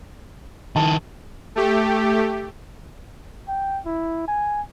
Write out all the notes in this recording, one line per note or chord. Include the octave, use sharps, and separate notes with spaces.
D#3 E4 A5
A3 G4
G5
E4
G#5